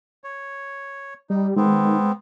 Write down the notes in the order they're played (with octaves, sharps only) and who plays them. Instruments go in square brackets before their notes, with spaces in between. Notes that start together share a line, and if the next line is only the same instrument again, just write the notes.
[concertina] C#5
[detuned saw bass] G3 [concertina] D#4
[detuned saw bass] D#3 [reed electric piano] G#3 [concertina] B3 C4